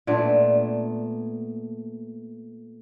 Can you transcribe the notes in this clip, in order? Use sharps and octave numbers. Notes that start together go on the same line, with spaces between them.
A#2 A3 B3 D4